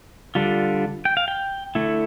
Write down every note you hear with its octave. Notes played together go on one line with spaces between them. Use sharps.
D3 G3 D4 F4
G5
F5
G5
D3 A3 E4